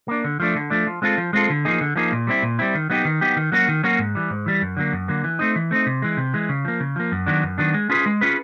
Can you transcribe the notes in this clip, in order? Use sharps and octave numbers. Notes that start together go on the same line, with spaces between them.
A#3 D4
D3
F3 A3 D4
D3
F3 A3 D4
F3
G#3 C4 F4 A4
F3
G#3 C4 F4 A4
D3
F3 A#3 D#4 G#4
D3
F3 A#3 D#4 G#4
A#2
G3 C4 E4
A#2
G3 C4 E4
D#3
F#3 B3 D#4 G4
D#3
F#3 B3 D#4 G4
D#3
F#3 A#3 C#4 F#4
D#3
F#3 A#3 C#4 F#4
G#2
E3 G3
G#2
E3 G3
F#2
D3 F#3 A#3
F#2
D3 F#3 A#3
E3
A3 C4 D#4
E3
A3 C4 D#4
C3
E3 G#3
C3
E3 G#3
C#3
F3 A#3
C#3
F3 A#3
F#2
D#3 F#3 B3 D4
F#2
D#3 F#3 B3 D4
G#3
C#4 F4 G#4 B4
G#3
C#4 F4 G#4 B4